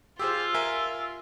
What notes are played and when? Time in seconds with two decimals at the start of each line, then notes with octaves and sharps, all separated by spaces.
0.19 F4 G4 G#4 C5 E6
0.54 A#4 E5 G#5